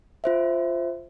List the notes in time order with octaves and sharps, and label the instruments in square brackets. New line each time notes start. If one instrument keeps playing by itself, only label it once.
[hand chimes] F4 C5 E5